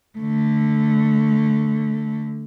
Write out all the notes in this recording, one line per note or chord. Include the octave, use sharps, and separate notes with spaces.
D3 A3